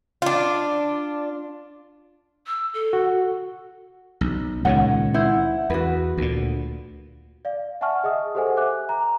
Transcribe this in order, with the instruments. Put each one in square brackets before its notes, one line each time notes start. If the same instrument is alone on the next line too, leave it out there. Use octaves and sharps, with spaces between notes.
[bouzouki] D4 F4
[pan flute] E6
A4
[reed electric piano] F#4
[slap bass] B1
[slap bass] C#2 A#2 D#3 [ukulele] C#5 F#5
[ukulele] E4 C5 F#5
[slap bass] E2 [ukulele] F#4 B4
[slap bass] D2 A#2
[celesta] D5 F5
E5 F#5 G#5 A5 C#6 F6
G#4 D#5 E5 D#6
G4 A4 C5 F#5 G#5
E5 G#5 D6 F#6
A#5